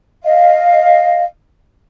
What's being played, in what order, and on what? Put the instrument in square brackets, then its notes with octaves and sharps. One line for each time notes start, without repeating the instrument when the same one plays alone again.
[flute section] D#5 F5